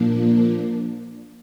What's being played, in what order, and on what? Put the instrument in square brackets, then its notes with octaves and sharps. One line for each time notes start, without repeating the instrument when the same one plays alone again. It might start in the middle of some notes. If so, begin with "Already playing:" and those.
Already playing: [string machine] A#2 F3 A#3 D4